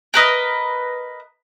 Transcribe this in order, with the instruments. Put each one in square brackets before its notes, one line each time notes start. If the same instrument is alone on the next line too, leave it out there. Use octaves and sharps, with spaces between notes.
[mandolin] A#4 B4 D#5